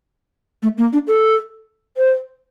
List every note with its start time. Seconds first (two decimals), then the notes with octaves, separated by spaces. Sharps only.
0.62 A3
0.77 A#3
0.92 D4
1.07 A4
1.97 C5